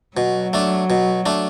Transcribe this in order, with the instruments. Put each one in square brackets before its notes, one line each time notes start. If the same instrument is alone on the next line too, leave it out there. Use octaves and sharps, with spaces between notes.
[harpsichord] B2 [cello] F#3
[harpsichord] A3 D4
B2
A3 D4